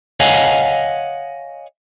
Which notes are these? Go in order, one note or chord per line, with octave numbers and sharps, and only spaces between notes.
C#5 D#5 F5 F#5 G#5